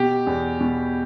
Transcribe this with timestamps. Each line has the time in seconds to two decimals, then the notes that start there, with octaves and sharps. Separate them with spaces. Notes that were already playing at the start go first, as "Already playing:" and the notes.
Already playing: B2 G4
0.27 E2
0.60 B2